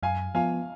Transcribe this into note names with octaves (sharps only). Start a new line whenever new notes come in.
F#2 F5 G#5
F3 B3 F4 F5 G#5